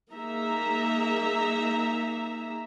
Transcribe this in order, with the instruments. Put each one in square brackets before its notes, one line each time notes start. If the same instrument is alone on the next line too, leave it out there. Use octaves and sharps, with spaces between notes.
[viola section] A#3 D#4 G#4 E5 A#5